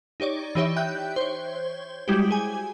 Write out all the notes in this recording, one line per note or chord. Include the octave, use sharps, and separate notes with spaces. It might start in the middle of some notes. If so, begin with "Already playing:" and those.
D#4 G4 C#5 D5
E3 D#4 G4 C#5 E5
E5 G5 F#6 G6
C5 C#5
G3 G#3 E4 F#4 G4
G#4 G#5